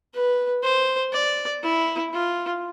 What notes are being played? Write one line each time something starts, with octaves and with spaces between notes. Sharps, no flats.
B4
C5
D5
E4
F4